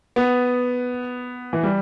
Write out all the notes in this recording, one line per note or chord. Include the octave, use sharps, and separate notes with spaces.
B3
E3
G3